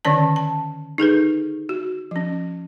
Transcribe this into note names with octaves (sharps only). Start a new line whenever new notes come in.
D3 D#3 C#4 D5 A5
A5
D#4 G#4 A4 B4
F#4
F3 C#4